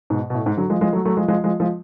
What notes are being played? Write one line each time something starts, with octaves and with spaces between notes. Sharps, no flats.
G#2 B2
B2
A2
G#2
D3 F#3
F3 G#3
F3 G#3
F#3 A3
F#3 A3
F3 G#3
F3 G#3
F3 G#3
F3 G#3